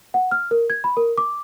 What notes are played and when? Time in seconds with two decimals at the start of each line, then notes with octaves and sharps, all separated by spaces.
0.14 F#5
0.31 F6
0.51 A#4
0.70 G#6
0.84 B5
0.97 A#4
1.18 D6